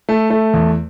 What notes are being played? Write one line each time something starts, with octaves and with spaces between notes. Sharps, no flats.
A3
A3
E2